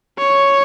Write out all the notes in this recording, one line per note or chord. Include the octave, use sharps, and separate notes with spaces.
C#5